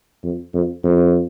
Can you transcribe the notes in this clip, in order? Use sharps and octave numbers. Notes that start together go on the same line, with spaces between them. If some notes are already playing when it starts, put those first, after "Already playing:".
F2
F2
F2